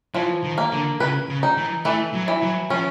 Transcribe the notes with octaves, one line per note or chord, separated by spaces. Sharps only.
E3 F3
D#3
A#3
D3
C#3 B4
C#3
D#4
E3
E3 A3
F#3
E3
F#3
F3 C#4